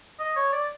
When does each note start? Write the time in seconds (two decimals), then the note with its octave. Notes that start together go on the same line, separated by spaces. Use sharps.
0.19 D#5
0.36 C#5
0.52 D5